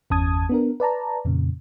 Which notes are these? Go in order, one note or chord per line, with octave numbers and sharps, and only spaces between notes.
G1 E2 C#4 A5 D#6 G#6
B3 D4 A#4
B4 D5 A5 A#5
F2 A#2 C#3